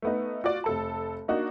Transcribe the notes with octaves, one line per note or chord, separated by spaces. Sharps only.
A3 B3 D#4
F4 F#4 D5
F1 A4 A5
A#3 D4 D#4 F#4